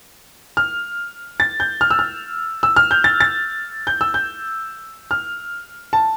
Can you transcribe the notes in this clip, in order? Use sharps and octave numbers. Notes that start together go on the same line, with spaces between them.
F6
A6
G6
F6
E6
F6
E6
F6
G6
A6
A6
G6
E6
G6
F6
A5